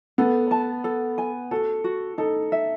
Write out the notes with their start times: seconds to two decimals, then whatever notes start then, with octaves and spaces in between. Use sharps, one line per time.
0.18 B3 A4
0.51 A5
0.84 A4
1.18 G#5
1.51 F#4 A4
1.84 F#4
2.18 D#4 A4
2.52 E5